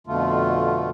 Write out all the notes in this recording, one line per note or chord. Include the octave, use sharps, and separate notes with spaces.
F2 B2 D3 A3 F4